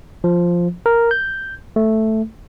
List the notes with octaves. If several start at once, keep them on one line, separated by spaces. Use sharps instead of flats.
F3
A#4
G6
A3